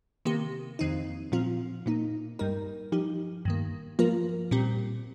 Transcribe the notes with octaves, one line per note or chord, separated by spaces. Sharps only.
C3 D#3 A#3 G4
F2 D#3 C4 D#4
A#2 F3 C4 F4
A#2 A#3 D#4
G2 G3 D#4 A#4
F3 D#4 G4
G2 D#3 A#3
F3 A#3 F4 A#4
A#2 G3 C4 G4